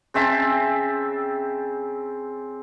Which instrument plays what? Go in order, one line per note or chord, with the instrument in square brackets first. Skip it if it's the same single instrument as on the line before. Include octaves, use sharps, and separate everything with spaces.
[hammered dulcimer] C#3 C4 E5 A5